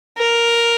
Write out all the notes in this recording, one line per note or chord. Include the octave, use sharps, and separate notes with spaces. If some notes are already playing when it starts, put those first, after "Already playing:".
A#4